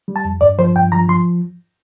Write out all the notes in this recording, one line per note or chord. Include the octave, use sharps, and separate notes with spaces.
G3
A5
F2
G2 D5
F3 C5
G2 G5
F3 A#5
F3 C6